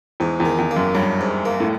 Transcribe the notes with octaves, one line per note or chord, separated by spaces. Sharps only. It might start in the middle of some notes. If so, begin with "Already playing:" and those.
E2 G#2
E2
D#3
E2
A#3
F#2
G2 F#3
G#2
A#3
A2